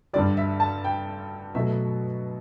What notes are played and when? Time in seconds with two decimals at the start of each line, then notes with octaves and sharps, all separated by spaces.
0.13 G2 D3 G3 D5
0.37 E5
0.60 A5
0.84 G5
1.55 B2 F#3 A3 E5